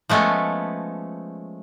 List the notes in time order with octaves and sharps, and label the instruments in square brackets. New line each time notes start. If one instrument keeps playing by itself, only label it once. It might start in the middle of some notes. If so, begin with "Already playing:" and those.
[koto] F3 G#3 A3 B3 C#4